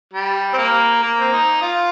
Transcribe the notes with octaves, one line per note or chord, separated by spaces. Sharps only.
G3
C4
A#3
A#3
C4
D#4
F4